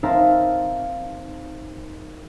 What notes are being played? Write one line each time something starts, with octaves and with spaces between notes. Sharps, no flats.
C4 D#4 A#4 E5 F5 A5